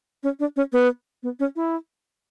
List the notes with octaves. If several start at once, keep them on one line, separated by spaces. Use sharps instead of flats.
C#4
D4
C#4
B3
B3
C#4
E4